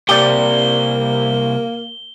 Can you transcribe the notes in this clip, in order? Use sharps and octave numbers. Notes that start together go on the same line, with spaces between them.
C2 C3 A#3 G4 D5 G7